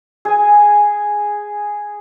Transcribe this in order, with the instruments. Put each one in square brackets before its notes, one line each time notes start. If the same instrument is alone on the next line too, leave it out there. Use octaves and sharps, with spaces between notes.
[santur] G#4 G#5